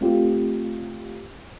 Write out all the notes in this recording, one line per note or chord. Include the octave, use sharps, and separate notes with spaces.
A3 C4 F4 G4